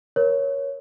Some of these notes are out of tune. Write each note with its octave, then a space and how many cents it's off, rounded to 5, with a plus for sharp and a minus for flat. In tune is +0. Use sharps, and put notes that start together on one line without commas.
A#4 +30 C#5 +0